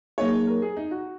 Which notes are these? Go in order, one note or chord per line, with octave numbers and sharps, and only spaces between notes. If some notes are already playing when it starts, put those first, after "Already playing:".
F#3 A#3 D#4 G#4 C#5
A#4
G#4
D#4
F#4